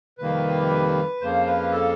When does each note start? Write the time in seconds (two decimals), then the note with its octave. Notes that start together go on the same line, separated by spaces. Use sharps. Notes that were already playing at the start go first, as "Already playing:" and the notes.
0.18 F2 C3 D#3 G3 A#3 B4
1.21 F2 C#3 F3 A#3 C5
1.47 B4
1.71 A4